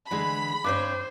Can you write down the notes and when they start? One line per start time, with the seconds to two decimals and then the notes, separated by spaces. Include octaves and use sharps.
0.11 D3 E3 G#3 B5
0.64 G2 C4 C5 C#5 D6